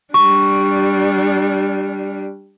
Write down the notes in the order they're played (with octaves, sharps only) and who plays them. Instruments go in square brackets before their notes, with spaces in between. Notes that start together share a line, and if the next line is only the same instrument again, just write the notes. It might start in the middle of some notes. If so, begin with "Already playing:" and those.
[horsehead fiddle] G3 D4 [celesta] C#6